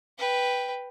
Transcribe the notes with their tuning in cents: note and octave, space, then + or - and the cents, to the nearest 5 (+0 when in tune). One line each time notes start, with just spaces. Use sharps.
B4 +0 G5 +0